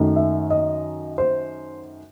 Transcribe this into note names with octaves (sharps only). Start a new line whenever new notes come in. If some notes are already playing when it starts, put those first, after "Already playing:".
Already playing: F#2 D#3 A3
E5
D#5
C5